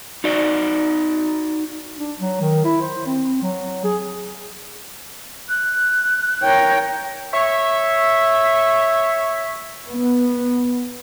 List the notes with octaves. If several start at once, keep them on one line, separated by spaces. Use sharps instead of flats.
D#4 F#4 D5
D4
F#3
D#3
E4
C5
C4
F#3
G#4
F#6
A#4 C#5 G5
C#5 E5
B3